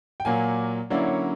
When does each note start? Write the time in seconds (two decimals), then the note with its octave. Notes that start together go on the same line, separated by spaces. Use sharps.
0.20 G5
0.25 A#2 F#3 A#3 G#5
0.90 D3 F#3 A#3 C#4 E4 D5
1.07 C#5